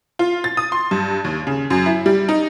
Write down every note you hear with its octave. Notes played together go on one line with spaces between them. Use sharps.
F4
A6
D#6
C6
G2
D#2
C#3
F#2
E4
G3
D#4